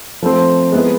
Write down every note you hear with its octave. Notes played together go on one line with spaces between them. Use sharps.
F3 A3 C4
G#3 B3 E4